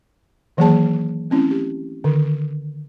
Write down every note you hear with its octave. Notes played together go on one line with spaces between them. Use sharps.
D#3 E3 F#3 A#3 G#4 A5
A3 C4 C#4 E4
G4
D3 D#3